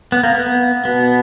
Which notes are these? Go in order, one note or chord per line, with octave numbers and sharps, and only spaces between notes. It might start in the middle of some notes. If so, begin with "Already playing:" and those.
B3
A#3
B3
B2 B3